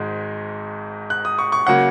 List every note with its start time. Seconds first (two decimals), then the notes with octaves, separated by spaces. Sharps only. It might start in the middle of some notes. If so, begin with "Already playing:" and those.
Already playing: G#1 G#2 G#3
1.10 F#6
1.25 D#6
1.39 C#6
1.52 C#6
1.67 C#3 F#3 A#3 F#5